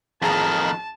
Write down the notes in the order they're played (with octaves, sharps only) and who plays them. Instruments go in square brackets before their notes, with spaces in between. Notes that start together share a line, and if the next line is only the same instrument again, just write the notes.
[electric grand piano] A1 G#4 A#5 [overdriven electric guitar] F2 D#3 [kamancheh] A5